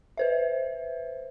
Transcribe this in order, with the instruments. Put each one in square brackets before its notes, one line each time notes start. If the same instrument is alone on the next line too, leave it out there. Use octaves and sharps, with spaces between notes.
[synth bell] B4 C5 E5